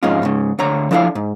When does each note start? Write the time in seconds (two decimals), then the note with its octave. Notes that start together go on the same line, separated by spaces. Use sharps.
0.03 F2 G#2 G#3 C#4 D#4 F4
0.23 G#2 C#3
0.59 D2 D3 C#5 A#5
0.91 F3 D4 E4 A4 F5
1.15 G#2